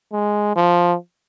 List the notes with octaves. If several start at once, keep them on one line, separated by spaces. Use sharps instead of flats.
G#3
F3